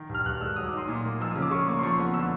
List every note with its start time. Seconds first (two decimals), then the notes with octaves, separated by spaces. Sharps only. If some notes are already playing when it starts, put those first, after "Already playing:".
Already playing: D#3
0.09 G2
0.15 F6
0.26 G2 F#6
0.41 G#3 E6
0.56 F#3 D#6
0.67 D6
0.73 D#4 C6
0.88 A#2
1.05 A#3
1.20 F3 E6
1.31 C#3 D#6
1.42 D6
1.51 C#3 C#6
1.66 A#3 C#6
1.79 C6
1.83 F3 C#6
1.99 B3
2.14 D3 E6